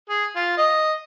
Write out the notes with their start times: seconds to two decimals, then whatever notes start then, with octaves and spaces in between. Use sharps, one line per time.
0.09 G#4
0.36 F4
0.58 D#5